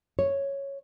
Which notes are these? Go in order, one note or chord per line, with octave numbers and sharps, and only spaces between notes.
C#5